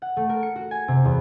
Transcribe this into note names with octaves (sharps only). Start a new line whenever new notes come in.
F#5
A3
A#4
C#7
F#4
G#5
C3
E2